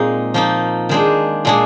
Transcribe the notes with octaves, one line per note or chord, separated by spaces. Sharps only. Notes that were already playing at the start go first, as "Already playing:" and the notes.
Already playing: A#2 G#3 C4 D#4 F4
F3 A#3 D#4
D#3 G#3 D4 G#4 C5
A#2 G#3 D4 G#4